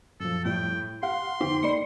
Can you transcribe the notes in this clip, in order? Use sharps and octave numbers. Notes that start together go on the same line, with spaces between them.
F#2 A#2 F3 A4
A2 G3 G5
G4 F5 F#5 C6
F2 D3 B3 D#4 G4
A3 A#3 D#4 D5 D#5 C#7